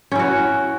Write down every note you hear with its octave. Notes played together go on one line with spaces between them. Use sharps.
C#4 E4 F#4